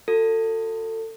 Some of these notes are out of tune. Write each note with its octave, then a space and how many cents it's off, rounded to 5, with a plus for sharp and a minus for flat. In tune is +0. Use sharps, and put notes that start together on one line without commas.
F#4 -30 A4 +30